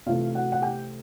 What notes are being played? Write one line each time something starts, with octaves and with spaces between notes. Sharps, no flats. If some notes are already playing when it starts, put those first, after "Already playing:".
C3 E3 A3 F4 F5
F#4 F#5
F#5
G4 G5